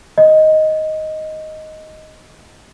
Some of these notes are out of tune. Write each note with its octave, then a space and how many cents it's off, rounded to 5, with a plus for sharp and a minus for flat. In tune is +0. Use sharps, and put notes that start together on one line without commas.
D#5 +5